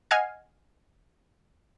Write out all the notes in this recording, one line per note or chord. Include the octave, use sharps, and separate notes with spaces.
D#5 F#5 G#5 F6 G#6 C7